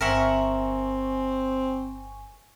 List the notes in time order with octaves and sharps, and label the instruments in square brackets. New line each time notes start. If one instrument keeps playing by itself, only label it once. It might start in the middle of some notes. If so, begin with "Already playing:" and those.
[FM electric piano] G1 G#5 C#6 [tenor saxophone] C4 [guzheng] A#4 E5 F#5